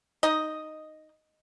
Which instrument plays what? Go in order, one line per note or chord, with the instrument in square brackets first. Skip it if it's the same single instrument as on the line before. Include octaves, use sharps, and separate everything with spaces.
[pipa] D#4 D#5